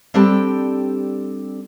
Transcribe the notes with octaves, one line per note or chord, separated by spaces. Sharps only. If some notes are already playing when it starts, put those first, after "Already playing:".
G3 C4 D4 G4 A4 G5